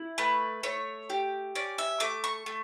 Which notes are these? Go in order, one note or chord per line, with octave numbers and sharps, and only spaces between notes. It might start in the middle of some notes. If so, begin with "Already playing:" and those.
Already playing: E4
A3 B4
A3 C#5
G4
C#4 D5
E5
A3 D6
C#6
A3